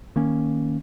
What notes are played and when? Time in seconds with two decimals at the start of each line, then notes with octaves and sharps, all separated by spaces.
0.16 D#3 A#3 C#4